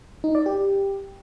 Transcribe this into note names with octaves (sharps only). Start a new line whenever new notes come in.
D#4
D5
G4